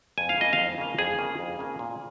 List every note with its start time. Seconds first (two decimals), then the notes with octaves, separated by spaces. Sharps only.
0.18 F2 G#5
0.29 F5
0.37 C#3 A#3 D#5
0.53 F5
0.58 F2
0.78 C#3 A#3
0.99 F2 G#4
1.19 C#3 A#3
1.39 F2
1.59 C#3 A#3
1.79 A#2